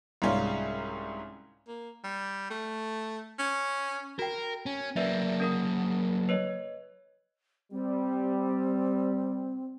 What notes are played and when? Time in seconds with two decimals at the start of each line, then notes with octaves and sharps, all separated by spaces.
0.22 C2 G#2 G3 C#4 F4
1.68 A#3
2.04 G3
2.50 A3
3.39 C#4
4.19 F#4 A#4 G5
4.66 C#4
4.96 F#3 A#3 B4 D5 E5
5.40 C#4 A#4 D#6
6.29 B4 C#5 D#5
7.72 G3 C4